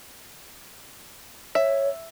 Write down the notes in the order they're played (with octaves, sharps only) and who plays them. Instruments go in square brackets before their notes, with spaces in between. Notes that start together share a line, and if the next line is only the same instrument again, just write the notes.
[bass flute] C#5 [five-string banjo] E5